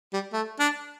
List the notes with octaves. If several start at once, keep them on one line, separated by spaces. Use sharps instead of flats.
G3
A3
D4